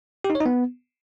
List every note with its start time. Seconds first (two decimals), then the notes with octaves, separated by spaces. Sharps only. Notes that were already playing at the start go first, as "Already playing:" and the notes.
0.24 G4
0.30 D#4
0.35 C#5
0.40 D#4
0.46 B3